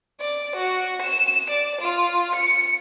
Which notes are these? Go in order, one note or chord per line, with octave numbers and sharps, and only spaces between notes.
D5
F#4
E7
D5
F4
C#7